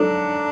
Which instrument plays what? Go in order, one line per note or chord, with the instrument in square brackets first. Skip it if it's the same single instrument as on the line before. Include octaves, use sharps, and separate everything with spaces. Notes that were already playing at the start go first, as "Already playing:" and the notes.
Already playing: [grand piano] F#3 A4 [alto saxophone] D4